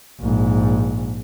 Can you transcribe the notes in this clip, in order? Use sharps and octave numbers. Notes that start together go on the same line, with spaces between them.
A#1 G#2